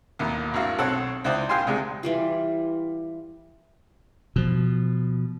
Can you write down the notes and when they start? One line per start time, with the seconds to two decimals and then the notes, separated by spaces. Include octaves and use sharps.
0.19 A1 D#2 B2
0.54 G#1 G2 E4 F#4 F5
0.79 B1 C4 A4 C#5 F#5
1.24 C#2 D#4 E4 C5 D5
1.49 A#1 G4 F5 G5 G#5 C6
1.67 C#2 C3 G3 G#3
2.03 E3 G3 F4
4.36 B2 F3